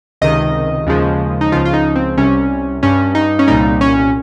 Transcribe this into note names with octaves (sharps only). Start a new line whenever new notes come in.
C#2 C3 D#3 D#5
D#2 C#3 F3 G#3
D#4
C#2 C#3 F3 F4
F4
D#4
C4
C2 C3 G3 C#4
G2 G3 C#4
D#4
C#4
C2 A#2 G3 D#4
C#4